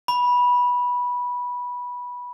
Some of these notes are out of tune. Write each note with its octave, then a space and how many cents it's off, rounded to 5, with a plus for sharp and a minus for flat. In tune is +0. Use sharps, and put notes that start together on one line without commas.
B5 -15